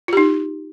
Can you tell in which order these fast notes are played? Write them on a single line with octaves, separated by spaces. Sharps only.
F4 G4 D#4